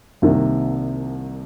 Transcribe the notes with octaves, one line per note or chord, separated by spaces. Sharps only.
C2 C3 D#3 A#3